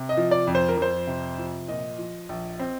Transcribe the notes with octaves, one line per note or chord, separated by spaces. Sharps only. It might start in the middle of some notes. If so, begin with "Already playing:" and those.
Already playing: C3
D#5
F3
D5
F2
C5
A#4
F2 C5
C3
F3
A#2 D#5
F3
A#1
C4